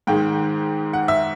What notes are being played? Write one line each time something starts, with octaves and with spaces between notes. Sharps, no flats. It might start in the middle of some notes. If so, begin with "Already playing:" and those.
G#2 D#3 G#3 G5
F#5
E5